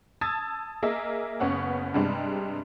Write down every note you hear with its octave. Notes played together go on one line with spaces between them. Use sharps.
A5 D#6 E6 G#6 A6
A#3 G#4 A#4 D#5 E5
F#1 B3 C#4 C#5 F#5
G2 C3 G3 G#3 D4